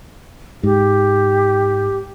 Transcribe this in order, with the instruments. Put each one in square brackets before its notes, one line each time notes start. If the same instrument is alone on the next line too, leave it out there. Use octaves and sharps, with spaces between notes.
[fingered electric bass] G#2 [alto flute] G4